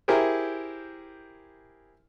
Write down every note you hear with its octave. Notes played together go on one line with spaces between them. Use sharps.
E4 G4 G#4 A#4 C5